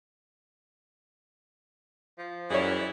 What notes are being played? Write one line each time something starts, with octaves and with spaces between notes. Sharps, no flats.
F3
F#2 E3 G3 E4 G#4 C#5